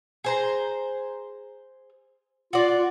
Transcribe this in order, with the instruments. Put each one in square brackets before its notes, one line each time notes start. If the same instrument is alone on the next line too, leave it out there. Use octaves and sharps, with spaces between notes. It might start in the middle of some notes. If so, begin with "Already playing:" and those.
[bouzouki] G#4 C5 A#5
[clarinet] F4 [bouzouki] F#4 D5